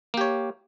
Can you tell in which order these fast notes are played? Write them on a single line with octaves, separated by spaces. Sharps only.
A#3 G4 C#5